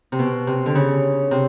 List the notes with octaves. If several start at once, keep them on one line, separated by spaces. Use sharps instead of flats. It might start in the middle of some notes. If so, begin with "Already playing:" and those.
C3
B2
C3
D3
C#3
C3